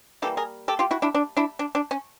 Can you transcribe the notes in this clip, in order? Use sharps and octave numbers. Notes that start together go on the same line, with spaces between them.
E3 G3 A#3 G4 A4
G#4 A#4
G4 A4
F4 G4
E4 F#4
D4 E4
D4
D4 E4
D4
D4
C#4